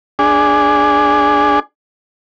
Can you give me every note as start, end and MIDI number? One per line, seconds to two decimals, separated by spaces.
0.19 1.60 62
0.19 1.60 68